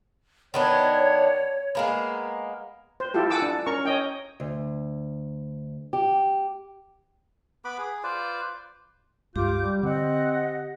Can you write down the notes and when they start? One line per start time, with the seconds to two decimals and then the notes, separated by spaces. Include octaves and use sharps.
0.54 D#3 B3 D4 C#5
1.75 G#3 A#3 B3
3.00 C5
3.14 E4 F4 G4 A4
3.30 A4 F#5 G#5 D6 E6
3.42 D4
3.66 C#4 A#4 A#5 C#6
3.85 C#5 D#5 G5
4.40 D2
5.93 G4
7.65 B3 B4 B5 D6
7.78 G#4
8.03 F4 B4 C5 D5
9.36 C#2 G2 G#3 F4 G4 D6 G6
9.60 G3
9.83 D3 C4 D#5 F#5